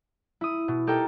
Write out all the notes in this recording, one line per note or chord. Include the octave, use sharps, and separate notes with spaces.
E4 D#6
B2
D#4 G4 A4 A#4 G5